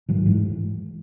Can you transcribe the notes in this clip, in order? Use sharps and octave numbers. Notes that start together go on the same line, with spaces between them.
G#2 D#3 F#3
G#2 E3 G#3